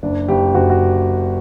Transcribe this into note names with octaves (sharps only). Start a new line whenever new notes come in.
F#1 D4
F#1 G4
F#1 F#4
F#4